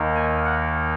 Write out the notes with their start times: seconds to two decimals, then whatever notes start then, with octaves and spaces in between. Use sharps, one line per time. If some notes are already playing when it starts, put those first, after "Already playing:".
Already playing: D#2 D#3 A#3 D#4
0.16 G#5
0.45 F#5